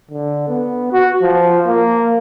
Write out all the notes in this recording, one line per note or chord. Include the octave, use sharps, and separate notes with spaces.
D3
B3
F#4
F3
A#3